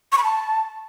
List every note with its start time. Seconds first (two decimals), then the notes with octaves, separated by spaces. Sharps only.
0.12 C#6
0.18 B5
0.23 A5